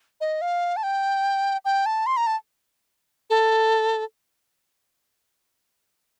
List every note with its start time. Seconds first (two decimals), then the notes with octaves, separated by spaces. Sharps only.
0.21 D#5
0.42 F5
0.77 A5
0.83 G5
1.65 G5
1.86 A5
2.06 C6
2.17 A#5
2.27 A5
3.30 A4